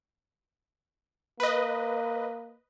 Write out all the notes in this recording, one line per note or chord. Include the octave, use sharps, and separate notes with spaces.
A#3 B4 D#5